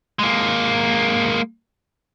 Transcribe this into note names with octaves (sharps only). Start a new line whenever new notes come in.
G#3 A#3